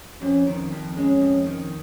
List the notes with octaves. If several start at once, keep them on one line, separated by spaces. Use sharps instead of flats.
F2 C#4
D#3
F2
G#3 C#4
F2
D#3